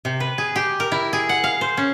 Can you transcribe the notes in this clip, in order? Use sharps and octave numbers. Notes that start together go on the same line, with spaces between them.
C3
B4
G#4
G4
A#4
E4
G#4
F#5
F5
C5
C#4